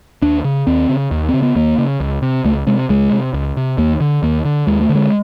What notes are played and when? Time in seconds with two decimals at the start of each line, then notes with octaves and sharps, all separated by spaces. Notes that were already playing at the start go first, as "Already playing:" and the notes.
0.22 D#2 D4
0.44 C#3
0.67 D#2 C4
0.89 C#3
1.11 D#2
1.29 C#3 C4
1.42 B3
1.56 D#2 A#3
1.78 C#3
2.00 C#2
2.22 C3
2.45 C#2 A3
2.67 C3 G#3
2.89 C#2 G#3
3.11 C3
3.34 C#2
3.57 C3
3.78 D#2 A#3
4.00 D3
4.23 D#2 A#3
4.45 D3
4.67 D#2 G#3
4.81 A3
4.89 D3
4.95 G#3